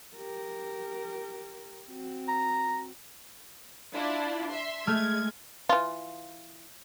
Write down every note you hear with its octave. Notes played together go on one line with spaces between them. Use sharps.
G4 A#4
C4 F#4
A#5
D4 E4 F4
E5 C6
G#3 A3 F6 G#6
E3 F4